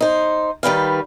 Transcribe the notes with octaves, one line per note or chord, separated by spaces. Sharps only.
D#4 C5
D#3 G3 B4 F5